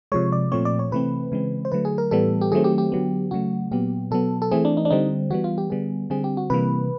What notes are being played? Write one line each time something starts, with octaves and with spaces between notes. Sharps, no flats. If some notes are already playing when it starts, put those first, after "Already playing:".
C3 F3 G#3 C#5
D5
A#2 F3 A3 C4 C#5
D5
C#5
C3 E3 A3 C4 B4
C#3 E3 G#3 C4
C5
D3 F#3 A3 B4
G#4
A#4
A2 E3 G3 B3 A4
G4
D#3 F#3 A3 C4 G#4
G4
G4
D3 F#3 B3
C#3 F#3 A3 F#4
A#2 F#3 B3 G4
B2 F#3 B3 A4
A4
E3 A3 C4 G#4
D4
D#4
D4
D3 G3 C4 D#4
E3 G3 B3 F#4
F4
G4
D3 G3 B3 G#4
D3 G3 C4 G#4
G4
F#4
C3 E3 G3 A#3 B4